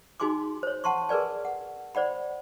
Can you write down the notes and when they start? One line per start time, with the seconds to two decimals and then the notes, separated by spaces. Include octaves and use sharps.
0.20 D#4 F#4 G#4 G#5 C6 D6
0.63 C5 C#5
0.84 F#5 A5 C6 C#6
1.09 G#4 A#4 B4 D5 G#5
1.45 F#5
1.95 C5 D5 F#5 B5